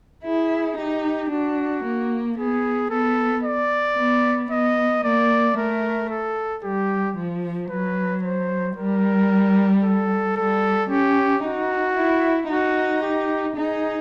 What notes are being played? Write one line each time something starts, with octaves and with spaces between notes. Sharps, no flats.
E4 G#4
D#4 G4
D4 F#4
A#3
B3 G#4
B3 A4
D5
B3
B3 D#5
A#3 D5
A3 A#4
A4
G3 G4
F3
F#3 B4
C5
G3 A#4
A4
G3 A4
C#4 G4
D#4 F#4
E4
D#4 F#4
G4
D#4 G#4